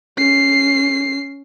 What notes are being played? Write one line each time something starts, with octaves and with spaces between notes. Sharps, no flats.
C#4 C7